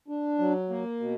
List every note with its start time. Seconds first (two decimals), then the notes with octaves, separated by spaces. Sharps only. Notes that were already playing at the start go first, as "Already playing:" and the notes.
0.08 D4
0.39 F#3
0.70 A#3
1.00 B2